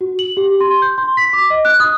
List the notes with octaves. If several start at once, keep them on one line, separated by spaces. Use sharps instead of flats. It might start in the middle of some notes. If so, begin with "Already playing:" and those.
F#4
F#7
G4
C6
G6
C6
B6
D6
D#5
F#6
D#6